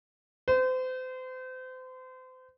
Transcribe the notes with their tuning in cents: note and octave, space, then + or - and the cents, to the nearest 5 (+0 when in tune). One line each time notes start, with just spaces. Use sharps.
C5 -35